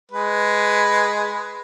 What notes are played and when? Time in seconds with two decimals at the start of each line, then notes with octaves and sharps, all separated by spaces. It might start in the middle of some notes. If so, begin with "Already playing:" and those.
0.12 G#3 B4